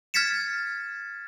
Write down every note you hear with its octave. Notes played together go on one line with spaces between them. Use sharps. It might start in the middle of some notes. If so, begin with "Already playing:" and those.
F6 G#6 A6 B6 C#7 E7